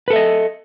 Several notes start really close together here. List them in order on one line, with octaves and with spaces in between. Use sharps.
B4 A4 E5 D#5